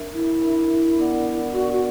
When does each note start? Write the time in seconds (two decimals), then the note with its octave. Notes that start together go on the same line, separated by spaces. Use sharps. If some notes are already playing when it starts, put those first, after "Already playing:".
Already playing: D4 A#4 E5
0.13 E4
0.41 D4 A#4 E5
0.98 B3 D4 A#4 D5 F#5
1.53 B3 D4 F#4 A#4 D5 F#5
1.73 F#4